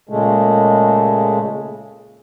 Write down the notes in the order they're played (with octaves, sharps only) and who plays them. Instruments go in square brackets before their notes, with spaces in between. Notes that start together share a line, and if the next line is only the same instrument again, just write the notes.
[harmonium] A#2 C#3 G#3 A3